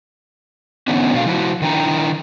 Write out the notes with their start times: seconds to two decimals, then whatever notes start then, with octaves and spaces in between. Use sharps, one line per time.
0.88 D3 E3 B3 C#4 D#4
1.14 B2 A3 D4 F#4 F5
1.26 F3 E4 F#4
1.62 D#3 D4 E4 G5 A#5